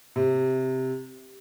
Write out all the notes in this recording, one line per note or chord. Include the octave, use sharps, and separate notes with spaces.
C3